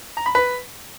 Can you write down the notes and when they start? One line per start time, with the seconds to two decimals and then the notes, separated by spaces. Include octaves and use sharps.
0.17 A#5
0.26 B5
0.35 B4